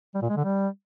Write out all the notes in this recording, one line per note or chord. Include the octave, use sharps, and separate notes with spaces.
G3
A#2
G#3
D3
G3